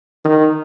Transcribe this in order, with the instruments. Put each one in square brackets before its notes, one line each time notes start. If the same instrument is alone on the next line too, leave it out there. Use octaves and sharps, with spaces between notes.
[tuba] D#3